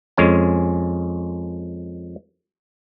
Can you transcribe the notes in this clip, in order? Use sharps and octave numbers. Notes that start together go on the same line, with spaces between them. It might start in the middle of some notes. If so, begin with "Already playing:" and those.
F2 G#3 C#4 G#5